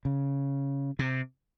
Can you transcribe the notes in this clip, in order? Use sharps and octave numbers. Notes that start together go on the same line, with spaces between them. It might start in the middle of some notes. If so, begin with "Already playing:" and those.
C#3
C3